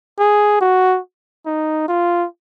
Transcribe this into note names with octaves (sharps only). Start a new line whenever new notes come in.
G#4
F#4
D#4
F4